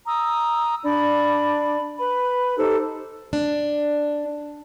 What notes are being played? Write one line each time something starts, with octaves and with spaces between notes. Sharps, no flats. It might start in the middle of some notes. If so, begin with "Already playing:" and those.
A#5 D#6 E6
D4 D5 B5
B4 B5
D#4 G4 A4 C5
D4